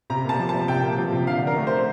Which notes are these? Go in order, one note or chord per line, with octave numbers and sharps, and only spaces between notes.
C3 A#5
A#3 A5
F3
A5
C3
C3 G5
A#3
F3
C3
D3 F5
D4
A#4
A3
C5
D3